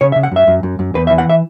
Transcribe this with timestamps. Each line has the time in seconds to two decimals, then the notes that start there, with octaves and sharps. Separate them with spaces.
0.01 C#3 C#5
0.12 E5
0.16 C#3
0.23 F#5
0.31 F#2 E5
0.47 F#2
0.63 F#2
0.79 F#2
0.94 E2 B4
1.07 E5
1.10 E3
1.18 F#5
1.29 E5